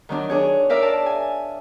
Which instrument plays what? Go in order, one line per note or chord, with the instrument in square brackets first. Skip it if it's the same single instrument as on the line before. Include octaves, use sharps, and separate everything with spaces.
[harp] D#3 F#3 D4
D4 G#4 C#5
A#4 D5 E5 F5
A5
G#5